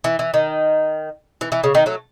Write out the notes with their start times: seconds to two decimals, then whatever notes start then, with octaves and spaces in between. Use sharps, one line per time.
0.04 E3
0.19 E3
0.34 D#3
1.41 E3
1.52 E3
1.64 C#3
1.75 D#3
1.86 F#3 A3